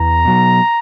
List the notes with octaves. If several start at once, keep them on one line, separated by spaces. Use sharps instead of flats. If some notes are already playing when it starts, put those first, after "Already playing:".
Already playing: E2 A#5
B2 F#3